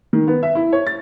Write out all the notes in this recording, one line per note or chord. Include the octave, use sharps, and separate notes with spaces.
D#3
B3
E5
E4
C#5
A6